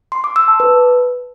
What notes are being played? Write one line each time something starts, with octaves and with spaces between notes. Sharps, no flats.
C6
D6
E6
A5
B4